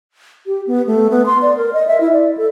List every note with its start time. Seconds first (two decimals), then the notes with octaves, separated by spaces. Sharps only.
0.47 G4
0.67 B3
0.87 A3
1.10 B3
1.26 C6
1.42 D5
1.57 A#4
1.73 D#5
1.87 E5
2.00 E4
2.13 D5
2.38 A4